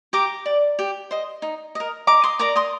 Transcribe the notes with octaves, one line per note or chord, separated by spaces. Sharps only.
G4 A#5 D6
D5
G4
C5 D#5
D#4
A#4 D#5
D#4 A#5 D6
C6 D#6
A#4 D5 A#5 D6
C6 D#6